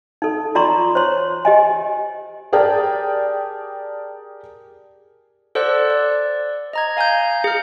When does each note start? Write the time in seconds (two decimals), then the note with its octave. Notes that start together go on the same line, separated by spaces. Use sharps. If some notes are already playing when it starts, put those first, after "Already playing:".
0.22 D#4 A4
0.55 F4 D5 A#5 C6 C#6
0.95 C5 C#5 C6
1.45 G4 D#5 G#5
2.52 G4 G#4 A#4 D5 G5 A5
5.55 A4 C5 D5 F#5 E6 F#6
5.90 D5
6.73 D#5 A#5 G#6
6.97 F5 G#5 A#5 G6
7.44 G#4 F6